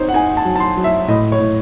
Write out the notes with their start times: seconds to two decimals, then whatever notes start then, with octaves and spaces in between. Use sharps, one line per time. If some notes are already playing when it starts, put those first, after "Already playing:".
Already playing: C4 D#4 C5 C#5
0.09 F#5
0.14 D#4 G#5
0.37 A5
0.45 F#3
0.56 A5
0.60 C6
0.77 F#3
0.84 E5
1.08 A2 D#5
1.32 C#5
1.39 A2